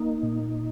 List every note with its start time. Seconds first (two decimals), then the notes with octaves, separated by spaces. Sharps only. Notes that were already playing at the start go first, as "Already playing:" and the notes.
Already playing: A#3 D#4
0.23 A#2